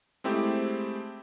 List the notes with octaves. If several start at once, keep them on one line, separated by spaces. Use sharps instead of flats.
G#3 A3 C4 E4 G4